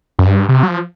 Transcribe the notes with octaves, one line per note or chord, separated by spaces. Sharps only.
F#2
G2
C3
F#3
F3